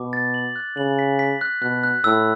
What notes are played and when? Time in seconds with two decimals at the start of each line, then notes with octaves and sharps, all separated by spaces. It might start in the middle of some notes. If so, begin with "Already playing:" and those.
Already playing: B2 D6
0.13 A6
0.34 F#7
0.56 F#6
0.77 C#3 F#7
0.99 B6
1.19 B6
1.41 F#6
1.62 B2 F#6
1.83 F#6
2.04 A2 E6